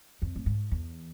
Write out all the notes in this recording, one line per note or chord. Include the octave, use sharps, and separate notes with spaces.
F2
A2
G#2
E2